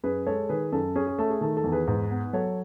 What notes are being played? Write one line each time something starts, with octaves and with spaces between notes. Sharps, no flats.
F#2 G#4 B4
G#3 A4 C#5
D#3 G#4 B4
F#2 A4
C#4 G#4
G#4
A3 A4
G#4
D#3 A4
A4
E2
G#4 B4
G#2
B3
F#3 A4 C#5